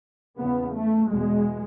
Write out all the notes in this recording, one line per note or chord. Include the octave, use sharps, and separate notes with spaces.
E2 C#3 B3
A3
E2 B2 G#3